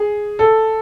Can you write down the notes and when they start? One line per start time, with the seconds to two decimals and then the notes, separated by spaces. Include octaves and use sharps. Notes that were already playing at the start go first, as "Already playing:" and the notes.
Already playing: G#4
0.39 A4